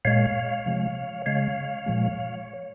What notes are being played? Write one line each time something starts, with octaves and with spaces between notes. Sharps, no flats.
A#2 G#3 C#5 F5
C3 F3 G#3
C#3 G#3 C#5 F5
A#2 F3 G#3